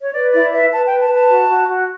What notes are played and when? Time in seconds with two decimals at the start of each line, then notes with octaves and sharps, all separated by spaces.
0.01 C#5
0.13 B4 D5
0.33 E4 D5
0.52 B4 E5
0.71 B4 A5
0.86 G5
0.91 B4
1.00 A5
1.10 B4
1.15 A5
1.29 F#4
1.48 F#4
1.68 F#4